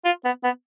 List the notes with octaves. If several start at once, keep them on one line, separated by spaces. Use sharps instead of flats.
F4
B3
B3